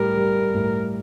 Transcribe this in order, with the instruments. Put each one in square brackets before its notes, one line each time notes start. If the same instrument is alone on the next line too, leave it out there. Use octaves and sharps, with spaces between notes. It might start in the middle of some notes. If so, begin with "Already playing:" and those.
Already playing: [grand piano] A2 G3 [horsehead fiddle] A#4
[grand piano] G3
A2